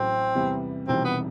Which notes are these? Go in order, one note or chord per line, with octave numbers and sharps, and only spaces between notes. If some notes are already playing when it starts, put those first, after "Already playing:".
Already playing: A1 A2 F#3 C4
E2 C3 E3 G3 B3
E1 E2 C3 D#3 G3 C4
B3